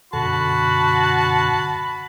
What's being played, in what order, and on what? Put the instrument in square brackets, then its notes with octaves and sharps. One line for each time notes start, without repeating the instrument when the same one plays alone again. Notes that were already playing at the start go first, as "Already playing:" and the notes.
[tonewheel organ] F#2 B2 D3 [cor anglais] F#4 [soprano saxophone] A5 [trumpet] B5